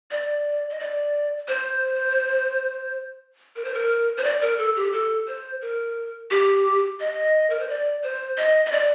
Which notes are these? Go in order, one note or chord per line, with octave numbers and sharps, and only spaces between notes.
D5
D#5
D5
C5
A#4
C5
A#4
C5
D5
A#4
A4
G4
A4
C5
A#4
G4
D#5
A#4
C5
D5
C5
D#5
D#5
D5